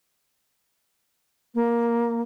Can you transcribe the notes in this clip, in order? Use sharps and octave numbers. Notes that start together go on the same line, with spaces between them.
A#3